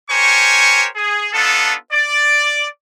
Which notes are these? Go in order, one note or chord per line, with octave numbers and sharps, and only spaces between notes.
G4 A#4 C5 C#5 G#5 C#6
G#4
B3 D4 D#4 F4 A4
D5